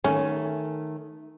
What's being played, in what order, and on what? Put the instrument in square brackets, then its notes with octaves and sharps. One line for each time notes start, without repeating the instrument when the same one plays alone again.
[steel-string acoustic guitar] D#3 A3 [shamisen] C#4